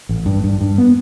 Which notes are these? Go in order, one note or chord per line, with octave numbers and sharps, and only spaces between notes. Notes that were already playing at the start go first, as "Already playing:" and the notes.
A1
G2
G2
G2
B3